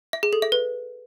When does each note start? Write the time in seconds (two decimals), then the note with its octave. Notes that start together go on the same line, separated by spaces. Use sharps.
0.13 E5
0.23 G#4
0.33 A4
0.42 E5
0.52 B4